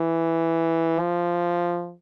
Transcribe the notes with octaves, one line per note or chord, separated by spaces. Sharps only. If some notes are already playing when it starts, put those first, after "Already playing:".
Already playing: E3
F3